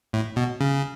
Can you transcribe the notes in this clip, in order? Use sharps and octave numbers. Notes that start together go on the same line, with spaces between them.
A2
B2
C#3